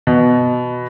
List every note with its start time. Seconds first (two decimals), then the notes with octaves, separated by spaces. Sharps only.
0.07 B2